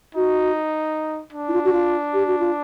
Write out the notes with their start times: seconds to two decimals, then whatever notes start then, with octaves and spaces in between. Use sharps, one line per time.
0.15 D#4 F#4
1.33 D4
1.48 E4
1.53 F4
1.65 F#4
1.73 F4
2.14 G4
2.27 F#4
2.39 F4